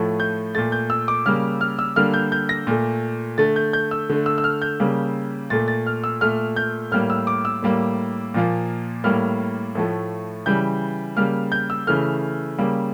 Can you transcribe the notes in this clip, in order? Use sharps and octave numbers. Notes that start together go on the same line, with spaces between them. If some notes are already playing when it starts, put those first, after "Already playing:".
Already playing: A2 F3 A3
G6
A#2 A3 A6
G6
E6
D6
C#3 G3 A#3 F6
F6
E6
D3 G3 A#3 F6
G6
G6
A#6
A#2 A3
D3 A3 A6
G6
G6
E6
D3 A3
E6
E6
F6
G6
C#3 G3 A#3
A#2 A3 A6
A6
F6
E6
A#2 A3 F6
G6
A2 G3 A#3 F6
E6
D6
E6
A2 G3 A#3
A#2 F3 A#3
A2 G3 A#3 F6
A2 F3 A3
C#3 E3 G3 G6
C#3 G3 A#3 F6
G6
E6
C#3 E3 A3 F6
C#3 G3 A#3